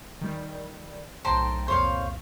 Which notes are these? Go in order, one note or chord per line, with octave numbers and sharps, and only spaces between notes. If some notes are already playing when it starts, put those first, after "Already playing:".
D#3 G3
B1 A2 C5 G5 A5 A#5
C2 F2 A#2 C5 C#5 F5